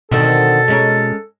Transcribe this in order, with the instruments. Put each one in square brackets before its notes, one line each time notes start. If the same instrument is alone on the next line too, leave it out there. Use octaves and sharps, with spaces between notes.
[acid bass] B2 [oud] D3 D#3 C4 [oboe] A4
[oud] G#3 C#4 A#4